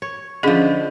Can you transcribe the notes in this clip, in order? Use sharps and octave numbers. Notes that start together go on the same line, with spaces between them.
C#5
D3 F3 C#4 G#4 D#5